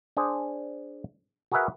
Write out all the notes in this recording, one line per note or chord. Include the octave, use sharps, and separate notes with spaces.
D4 G#4 C5
F#4 G#4 A#4 B4 E5 F#5